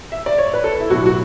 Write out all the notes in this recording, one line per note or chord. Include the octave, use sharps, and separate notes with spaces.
E5
D5
C#5
B4
A4
E4
B1 A2 F#3 F#4
F#4